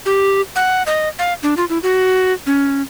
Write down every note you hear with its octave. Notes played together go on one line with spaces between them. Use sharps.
G4
F#5
D#5
F5
D4
F4
E4
F#4
C#4